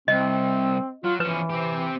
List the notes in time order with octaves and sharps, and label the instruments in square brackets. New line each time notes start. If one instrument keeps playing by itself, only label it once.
[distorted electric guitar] C2 [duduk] C4 [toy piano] D#5
[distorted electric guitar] F#3 [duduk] F4
[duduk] E3 [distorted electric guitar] F3 C#4 [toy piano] B4
[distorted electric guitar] C4 G4